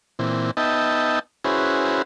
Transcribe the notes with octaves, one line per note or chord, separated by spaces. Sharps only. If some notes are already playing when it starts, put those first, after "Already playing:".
A#2 E3 C4
B3 D#4 D#5 E5 G5 A5
C#4 E4 F#4 G#4 B4 C5